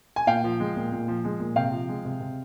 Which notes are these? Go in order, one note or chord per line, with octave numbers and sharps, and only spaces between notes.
G#5
A#2 F5 G5
F3
G#3
A#2
A#2
F3
G#3
A#2
C3 F5 G5
F3
G#3
C3
C3